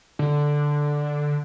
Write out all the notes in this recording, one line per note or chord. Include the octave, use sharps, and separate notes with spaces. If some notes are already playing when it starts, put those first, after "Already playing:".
D3